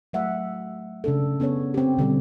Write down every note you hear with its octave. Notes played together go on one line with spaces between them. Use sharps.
F#3 A3 E5 F#5
C#3 D4 A4
B3 C#4 A4 C#5
C4 G4
B2 D3 G3 C4